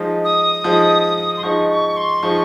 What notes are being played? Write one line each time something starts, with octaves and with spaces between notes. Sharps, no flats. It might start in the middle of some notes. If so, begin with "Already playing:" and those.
Already playing: F3 G#3 D#4
D#6
F3 G#3 D#4
C6
F3 G#3 D#4 C#6
C#6
C6
F3 G#3 D#4 C#6